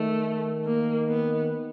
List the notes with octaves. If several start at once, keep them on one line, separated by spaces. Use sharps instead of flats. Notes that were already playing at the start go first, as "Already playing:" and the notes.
Already playing: D#3 A3
A#3
B3